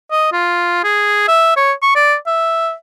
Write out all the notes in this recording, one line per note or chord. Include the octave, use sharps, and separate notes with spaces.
D#5
F4
G#4
E5
C#5
C#6
D5
E5